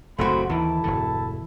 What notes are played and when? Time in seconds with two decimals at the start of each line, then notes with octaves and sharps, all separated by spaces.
0.19 F#1 D#2 A2 A3 C4 F#4 B5 C6
0.50 D#2 D#3 E3 E4 A4 A5
0.84 E1 G2 D3